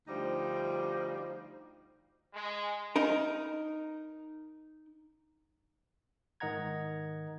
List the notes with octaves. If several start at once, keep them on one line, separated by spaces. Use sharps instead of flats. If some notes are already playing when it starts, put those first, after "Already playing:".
D2 F3 G3 D#4
G#3
D#4 A#4
G#2 D#3 D#5 F#5 A#5 G#6